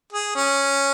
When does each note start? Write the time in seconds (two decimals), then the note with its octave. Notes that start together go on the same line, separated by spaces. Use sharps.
0.13 G#4
0.36 C#4